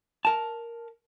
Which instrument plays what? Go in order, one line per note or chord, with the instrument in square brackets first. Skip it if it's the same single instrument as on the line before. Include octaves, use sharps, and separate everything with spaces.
[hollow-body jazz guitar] A#4 A5